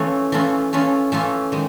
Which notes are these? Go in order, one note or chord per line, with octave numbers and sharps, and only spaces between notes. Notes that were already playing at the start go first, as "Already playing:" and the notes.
Already playing: E3 A3 C#4 F4
E3 A3 C#4 F4
E3 A3 C#4 F4
E3 A3 C#4 F4
D#3 G#3